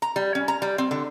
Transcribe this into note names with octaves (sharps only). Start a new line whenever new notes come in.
A#5
G3
C#4
A#5
G3
C4
D3